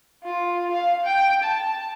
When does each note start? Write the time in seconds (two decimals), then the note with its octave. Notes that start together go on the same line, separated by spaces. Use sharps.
0.24 F4
0.71 F5
1.05 G5
1.43 A5